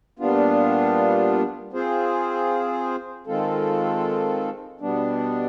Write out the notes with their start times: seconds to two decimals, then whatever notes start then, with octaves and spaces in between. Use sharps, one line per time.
0.19 A#2 G3 B3 D4 F4
1.73 C4 F4 G#4 C5
3.27 D#3 G#3 C4 F4 A4
4.80 B2 G3 B3 D4